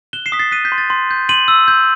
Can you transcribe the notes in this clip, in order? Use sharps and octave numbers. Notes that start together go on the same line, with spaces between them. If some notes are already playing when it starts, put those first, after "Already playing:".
F#6 E7 G7
C7 E7
D#6 B6
A6 C7
F#6 B6 D#7
G6 B6
C6
A6
C6
G6
C6 D#7 F#7
E6
G6